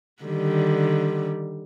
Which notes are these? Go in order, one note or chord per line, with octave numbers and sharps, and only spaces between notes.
D3 D#3 G3